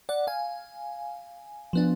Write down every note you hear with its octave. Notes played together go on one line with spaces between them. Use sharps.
D5 F#5
F5 G#5
F3 B3 D4